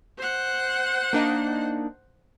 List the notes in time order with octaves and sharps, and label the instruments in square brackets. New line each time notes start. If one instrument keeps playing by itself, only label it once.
[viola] C5 F#5
[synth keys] A#3 D4 D#4